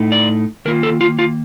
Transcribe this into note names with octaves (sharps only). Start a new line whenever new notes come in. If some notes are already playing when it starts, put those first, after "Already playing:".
Already playing: A2 A3 D#4
D5
D#3 A#3 F4 A#4
A4
F4
F4